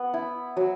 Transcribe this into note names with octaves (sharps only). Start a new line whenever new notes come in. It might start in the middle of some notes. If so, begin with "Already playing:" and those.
Already playing: B3
E4
F#3